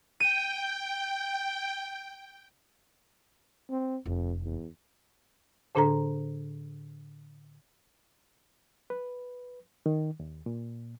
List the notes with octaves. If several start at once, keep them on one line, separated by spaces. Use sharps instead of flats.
G5 D#7
C4
F1 F2
E2
A2 D3 D4 A4 C5 A#5
B4
D#3
D#2
A#2